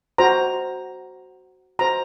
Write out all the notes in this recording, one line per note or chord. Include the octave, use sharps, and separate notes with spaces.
F#4 C5 A#5
F#4 C5 A#5